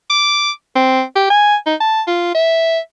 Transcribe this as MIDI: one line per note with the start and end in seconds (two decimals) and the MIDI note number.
0.10 0.51 86
0.76 1.03 60
1.16 1.30 67
1.30 1.56 80
1.66 1.75 63
1.80 2.02 81
2.07 2.32 65
2.35 2.79 76